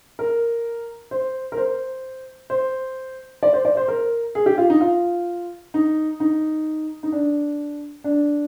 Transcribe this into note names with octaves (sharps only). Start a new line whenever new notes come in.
A#4
C5
A#4
C5
C5
D5
C5
D5
C5
A#4
G#4
G4
F4
D#4
F4
D#4
D#4
D#4
D4
D4